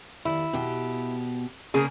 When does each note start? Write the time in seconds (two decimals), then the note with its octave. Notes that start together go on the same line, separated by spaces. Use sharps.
0.25 D#2 E4
0.53 B2 G4
1.74 C#3 A#3 C#4 G#4